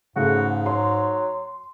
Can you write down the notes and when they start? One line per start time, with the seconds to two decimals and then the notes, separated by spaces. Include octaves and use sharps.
0.16 G#2 C#3 A3 F#4
0.66 F#3 C6